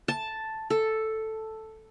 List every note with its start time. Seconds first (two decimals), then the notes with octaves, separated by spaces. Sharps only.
0.08 A5
0.70 A4